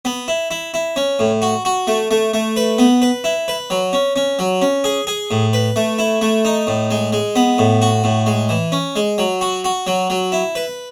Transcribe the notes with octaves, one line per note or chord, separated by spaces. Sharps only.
B3
E4
E4
E4
C#4
A2
F#4
F#4
A3
A3
A3
B4
B3
B4
E4
B4
F#3
C#4
C#4
F#3
C#4
G#4
G#4
A2
B4
A3
E4
A3
D#4
A2
G#3
G#3
B3
A2
F#4
A2
G#3
E3
C#4
G#3
F#3
F#4
F#4
F#3
F#3
E4
B4